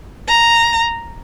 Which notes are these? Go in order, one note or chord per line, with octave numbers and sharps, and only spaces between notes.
A#5